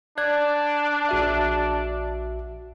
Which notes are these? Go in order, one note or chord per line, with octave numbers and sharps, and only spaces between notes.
D4 D5 F#6 G#6
A#1 F#4 E5